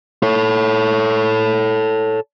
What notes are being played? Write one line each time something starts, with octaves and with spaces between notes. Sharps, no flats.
A4 C#5